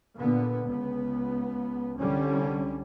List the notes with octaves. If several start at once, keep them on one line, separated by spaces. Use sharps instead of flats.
A#2 D3 B3
C#2 B3
C2 D3 G3 C#4